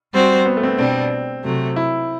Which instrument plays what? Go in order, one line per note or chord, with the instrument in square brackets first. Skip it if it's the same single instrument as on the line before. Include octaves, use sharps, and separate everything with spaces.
[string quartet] G3 C4 F#4 C5
[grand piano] B3
A3
C4
B3
[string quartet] B2 G3 D4 [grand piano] C4
[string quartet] C3 F#3 A3
[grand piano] E4